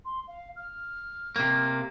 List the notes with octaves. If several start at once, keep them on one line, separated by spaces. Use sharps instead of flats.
C6
F5
F6
C3 A#3